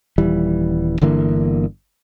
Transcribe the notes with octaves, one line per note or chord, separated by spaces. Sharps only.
D#1 E3 G3
G1 D3 E3 A#3